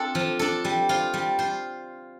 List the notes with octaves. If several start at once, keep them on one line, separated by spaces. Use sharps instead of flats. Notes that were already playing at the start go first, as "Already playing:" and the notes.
Already playing: C4 D4 F4 A4
F3
D4 A4
G3
F4 C5
G3
F4 C5